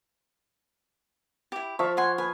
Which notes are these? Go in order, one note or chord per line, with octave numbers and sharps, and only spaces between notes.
E4 G4
F3 E5 F5 C#6
F#5 G#5 C6
B4 G#5